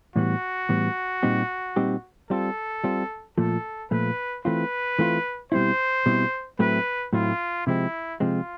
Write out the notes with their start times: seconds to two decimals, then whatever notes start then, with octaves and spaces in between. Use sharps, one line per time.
0.16 A2 E3 G3 B3 F#4
0.69 A2 E3 G3 B3
1.23 A#2 G3 C4 D#4 G4
1.76 A#2 G3 C4 D#4 G4
2.30 G3 C4 F4 A4
2.84 G3 C4 F4
3.38 A#2 F3 A3 A4
3.91 A#2 F3 A3 B4
4.45 E3 A3 C4 F4 B4
4.99 E3 A3 C4 F4
5.52 B2 G3 C4 E4 C5
6.06 B2 G3 C4 E4
6.59 A2 F#3 A3 C4 E4 B4
7.13 A2 F#3 A3 C4 E4 F4
7.66 C3 F3 G#3 C4 E4
8.20 C3 F3 G#3 C4 F4